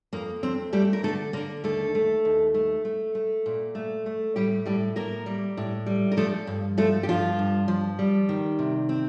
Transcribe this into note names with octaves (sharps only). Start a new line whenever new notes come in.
F2 A#3
F2 C4
G3 A3 G4
A#4
D3 A3 A4
D3 A#3 A#4
D#2 A3 A4
A3
D#2
A3
A3
A3
A#2
A3
A3
A2 G3 G4
A2 G3 G4
A2 A#3 A#4
G3
A2
G3
A#4
F3 A3 A4
G2
F3 A3 A4
G4
G2 F3 F4
G2
F3
G3
D#3
C3
C4